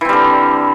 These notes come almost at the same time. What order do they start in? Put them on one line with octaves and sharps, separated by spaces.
E3 C4 G3 D3